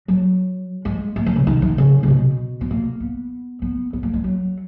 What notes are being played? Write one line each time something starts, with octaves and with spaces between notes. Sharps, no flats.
F#3
G#3
A#3
D#3
C#3
D#3
D#3
C#3
C#3
B2
B3
A#3
B3
B3
B3
A#3
G#3
F#3